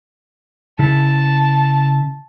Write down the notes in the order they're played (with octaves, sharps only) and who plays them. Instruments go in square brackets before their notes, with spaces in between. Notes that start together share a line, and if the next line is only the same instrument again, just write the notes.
[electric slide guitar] C#3 E4 [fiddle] A5